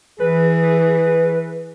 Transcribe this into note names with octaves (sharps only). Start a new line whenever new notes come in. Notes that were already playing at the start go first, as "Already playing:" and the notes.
E3 G#4 B4